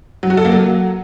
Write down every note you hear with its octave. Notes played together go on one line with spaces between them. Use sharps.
F#3
F#4
A4
A#3
F#3